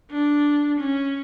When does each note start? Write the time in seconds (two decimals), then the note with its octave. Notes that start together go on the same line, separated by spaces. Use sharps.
0.11 D4
0.79 C#4